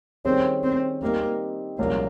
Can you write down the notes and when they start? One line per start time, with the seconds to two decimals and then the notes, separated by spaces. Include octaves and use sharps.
0.25 D#3 G3 C4 C#4 G#4 C#5
0.64 C4
1.01 G3 A#3 C4 D#4 G4
1.79 C2 A#2 F3 G#3 A#3 C#4